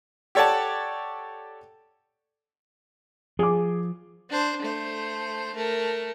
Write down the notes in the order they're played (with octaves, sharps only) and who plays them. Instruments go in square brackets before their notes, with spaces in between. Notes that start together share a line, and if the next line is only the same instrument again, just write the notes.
[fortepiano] G4 A4 C#5 D5 F#5 A5
[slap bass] F3 [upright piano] G#4 D6
[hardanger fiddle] D4 C5
A3 C5
A3 A#4